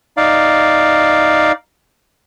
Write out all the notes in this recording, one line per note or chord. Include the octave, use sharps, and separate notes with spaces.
D#4 D5 F5